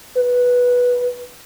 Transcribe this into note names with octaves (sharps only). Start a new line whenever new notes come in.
B4